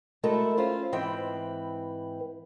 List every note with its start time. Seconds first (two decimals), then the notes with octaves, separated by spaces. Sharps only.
0.23 G#3 A3 E4 F#4 A4 A#4
0.57 C#4 F4 C5
0.92 G#2 E3 C4 B4 G5